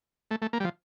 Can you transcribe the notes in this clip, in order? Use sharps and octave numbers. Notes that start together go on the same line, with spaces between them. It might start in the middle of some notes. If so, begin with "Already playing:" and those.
A3
A3
A#3
G3
F3